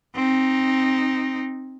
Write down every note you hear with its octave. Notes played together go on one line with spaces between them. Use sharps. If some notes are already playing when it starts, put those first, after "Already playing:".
C4 D#4